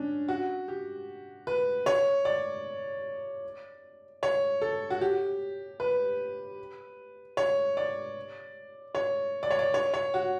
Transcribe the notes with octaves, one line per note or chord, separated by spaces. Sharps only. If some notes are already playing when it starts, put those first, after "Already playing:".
Already playing: C#4 D4
F#4
G4
B4
C#5
D5
C#5
A4
F#4
G4
B4
C#5
D5
C#5
D5
C#5
D5
C#5
C#5
F#4